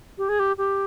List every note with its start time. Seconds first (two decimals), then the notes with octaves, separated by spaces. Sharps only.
0.18 G4
0.29 G#4
0.39 G4
0.58 G4